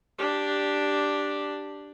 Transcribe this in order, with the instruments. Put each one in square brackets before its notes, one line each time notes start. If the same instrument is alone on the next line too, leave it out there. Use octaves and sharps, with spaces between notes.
[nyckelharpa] D4 G4